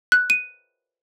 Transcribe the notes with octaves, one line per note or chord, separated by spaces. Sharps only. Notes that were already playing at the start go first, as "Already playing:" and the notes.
F#6
D#7